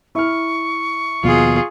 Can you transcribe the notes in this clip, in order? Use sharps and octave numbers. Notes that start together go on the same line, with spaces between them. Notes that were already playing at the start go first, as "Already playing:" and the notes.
E4 C#6 F6
D#2 B2 F3 F4 G#4